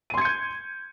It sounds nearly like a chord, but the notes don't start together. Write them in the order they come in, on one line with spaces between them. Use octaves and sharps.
D#7 C6 G#6 C#7 G6